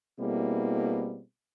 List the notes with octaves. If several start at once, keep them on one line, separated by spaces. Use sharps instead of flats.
B2 G3 A#3 C4 E4 G#4